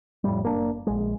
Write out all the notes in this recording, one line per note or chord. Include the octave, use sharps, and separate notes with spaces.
F2 A2 G3
F#1 A#3 D4
A#1 G#3